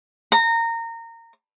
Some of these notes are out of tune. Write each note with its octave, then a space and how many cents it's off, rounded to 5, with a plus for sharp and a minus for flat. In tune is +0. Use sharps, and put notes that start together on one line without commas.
A#5 -20